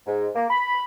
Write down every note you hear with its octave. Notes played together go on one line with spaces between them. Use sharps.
G#2
A#3
B5